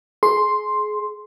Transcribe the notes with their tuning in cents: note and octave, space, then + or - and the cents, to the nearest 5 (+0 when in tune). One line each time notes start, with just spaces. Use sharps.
G#4 +30 C6 +0